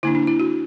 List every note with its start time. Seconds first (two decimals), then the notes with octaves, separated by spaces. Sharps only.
0.03 D3 A#3 D4 E4
0.15 D4
0.27 E4
0.40 F#4